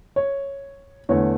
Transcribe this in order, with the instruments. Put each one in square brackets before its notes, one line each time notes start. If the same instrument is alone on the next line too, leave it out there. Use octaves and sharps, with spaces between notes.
[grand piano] C#5
E2 D3 A3 C#5